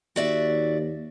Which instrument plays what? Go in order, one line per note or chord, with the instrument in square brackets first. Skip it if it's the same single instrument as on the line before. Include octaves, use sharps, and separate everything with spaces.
[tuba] D#2 [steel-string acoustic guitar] F#4 D5 E5